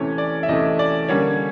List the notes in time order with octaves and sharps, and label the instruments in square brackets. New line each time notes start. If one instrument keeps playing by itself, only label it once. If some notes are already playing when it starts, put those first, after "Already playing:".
Already playing: [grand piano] C3 E3 A3 C#4 C#5
D5
E5
C3 E3 A3 C#4 D#5
D5
D3 G3 A#3 C#4 C#5